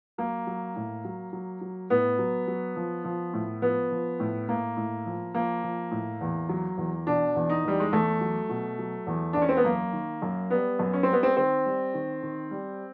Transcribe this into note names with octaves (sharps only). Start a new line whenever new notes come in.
F#3 A#3
F#3
A2
F#3
F#3
F#3
A2 B3
F#3
F#3
F3
F3
A2
F3 B3
F3
A2
A2 A#3
A2
F3
F3 A#3
F3
A2
E2
F#3
E2
B2 D4
E2
D#4
E2 G3
G#3
E2 A3
F#3
B2
F#3
E2
E2 D4
C#4
C4
B3
F#2 A#3
D#3
F#2
G3 B3
F#2
C#4
C4
G3 B3
C4
D#3 C4
G3
D#3
D#3
G3